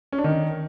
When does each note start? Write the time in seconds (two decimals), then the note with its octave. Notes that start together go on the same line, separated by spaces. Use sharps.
0.12 C#4
0.18 D4
0.24 D#3